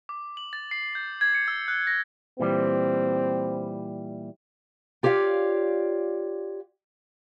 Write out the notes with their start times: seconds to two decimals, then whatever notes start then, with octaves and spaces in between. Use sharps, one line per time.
0.09 D6
0.37 F#7
0.53 A6
0.71 C7
0.95 G6
1.21 G#6
1.35 C#7
1.48 E6
1.68 F#6
1.87 A#6
2.40 A#2 E3 G3 C4
5.03 F4 G4 C#5 D5 F5